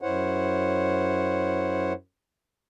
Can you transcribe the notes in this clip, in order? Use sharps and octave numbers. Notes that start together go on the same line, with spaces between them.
F#2 E4 C5 C#5 F#5